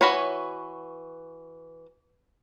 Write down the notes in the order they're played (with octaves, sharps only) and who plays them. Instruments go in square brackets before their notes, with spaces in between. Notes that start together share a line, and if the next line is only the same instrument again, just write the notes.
[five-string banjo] E3 F#4 B4 C#5